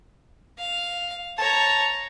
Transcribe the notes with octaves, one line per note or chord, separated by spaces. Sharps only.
F5
C#5 A5 A#5